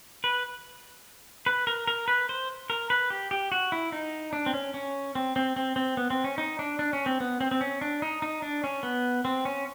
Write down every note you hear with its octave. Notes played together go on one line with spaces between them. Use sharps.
B4
B4
A#4
A#4
B4
C5
A#4
B4
G4
G4
F#4
E4
D#4
D4
C4
C#4
C#4
C4
C4
C4
C4
B3
C4
C#4
D#4
D4
D4
C#4
C4
B3
C4
C4
C#4
D4
D#4
D#4
D4
C#4
B3
C4
C#4